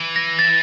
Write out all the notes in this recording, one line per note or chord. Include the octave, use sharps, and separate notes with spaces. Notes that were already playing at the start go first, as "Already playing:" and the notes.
Already playing: E3
A#6
A6